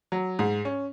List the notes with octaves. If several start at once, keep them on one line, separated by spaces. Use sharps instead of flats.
F#3
G#2
C#4